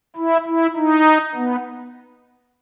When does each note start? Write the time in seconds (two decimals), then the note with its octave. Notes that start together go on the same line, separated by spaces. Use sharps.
0.16 E4
0.46 E4
0.76 D#4
1.35 B3